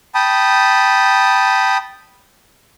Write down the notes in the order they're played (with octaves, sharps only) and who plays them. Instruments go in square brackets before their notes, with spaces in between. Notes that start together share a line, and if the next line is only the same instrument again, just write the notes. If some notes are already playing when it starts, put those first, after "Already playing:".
[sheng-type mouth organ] G5 A5 B5 D#6